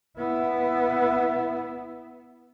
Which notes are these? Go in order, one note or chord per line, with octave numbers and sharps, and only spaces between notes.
B3 E4